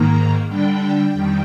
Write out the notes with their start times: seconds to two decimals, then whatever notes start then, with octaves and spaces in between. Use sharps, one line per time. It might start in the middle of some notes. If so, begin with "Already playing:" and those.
Already playing: G#2 D#3 A#3 A#5
0.48 D3 G3 D4 G5
1.13 F2 D#3 G3